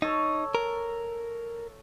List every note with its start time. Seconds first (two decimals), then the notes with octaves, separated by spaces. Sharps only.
0.02 D#4 A4 C#5
0.55 A#4